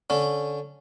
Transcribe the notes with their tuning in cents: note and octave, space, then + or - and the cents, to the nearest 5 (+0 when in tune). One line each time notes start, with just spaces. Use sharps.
D3 -15 C#4 -5